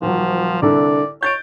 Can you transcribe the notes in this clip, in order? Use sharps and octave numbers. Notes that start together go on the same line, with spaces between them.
D#1 F3 F#3
C2 D3 A4 D5
C#5 G6 A6 D7